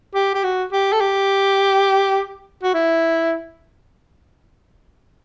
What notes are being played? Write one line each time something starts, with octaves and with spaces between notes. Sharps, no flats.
G4
G4
F#4
G4
A4
G4
F#4
E4